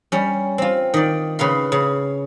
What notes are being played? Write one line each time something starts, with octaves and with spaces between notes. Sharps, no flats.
G3 C#4
C4 F4
D#3 D5
C#3 B4 F5 C6
C#3